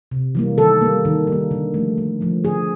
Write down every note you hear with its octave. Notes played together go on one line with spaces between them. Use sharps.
C3
E3 G3 A#3
D#3 A4
G3 A#3
D#3
G3 A#3
D3
F3 A3
D3
F3 A3
D3 G#4